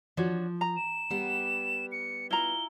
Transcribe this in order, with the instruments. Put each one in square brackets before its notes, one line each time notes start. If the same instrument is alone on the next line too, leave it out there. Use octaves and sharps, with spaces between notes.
[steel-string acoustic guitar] F3 [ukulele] D4 F#4 C#5
[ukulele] A#5
[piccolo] E7
[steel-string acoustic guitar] G3 B3 G4
[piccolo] C#7
[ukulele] E4 F4 A#5 [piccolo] G7